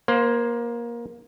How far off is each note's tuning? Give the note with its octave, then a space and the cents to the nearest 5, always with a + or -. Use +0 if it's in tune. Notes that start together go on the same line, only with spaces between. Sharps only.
A#3 +20 C5 +0